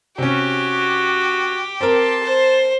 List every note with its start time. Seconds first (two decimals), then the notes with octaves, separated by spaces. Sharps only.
0.18 C3 C#4 F#4 G4
1.81 C4 A#4 A5 C6
2.22 C5